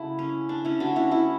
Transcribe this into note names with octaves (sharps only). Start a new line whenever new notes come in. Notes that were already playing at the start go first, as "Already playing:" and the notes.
Already playing: C#3 F#3 A3 E4
C#4
D4
C#4 E4
D3 A3 D4 F#4
C#4 E4
C#4 E4